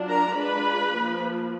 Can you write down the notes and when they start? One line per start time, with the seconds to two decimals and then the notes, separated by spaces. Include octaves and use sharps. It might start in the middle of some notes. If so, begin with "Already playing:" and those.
Already playing: F#3 D4 F4
0.08 A#4 A#5
0.37 G#3 D4 F4 B4 B5
0.95 F3 A#3 F4